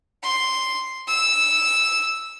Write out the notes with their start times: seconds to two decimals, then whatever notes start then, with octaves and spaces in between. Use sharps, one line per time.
0.23 C6
1.08 E6